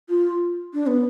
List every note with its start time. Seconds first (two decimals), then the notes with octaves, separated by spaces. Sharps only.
0.09 F4
0.74 D4
0.87 B3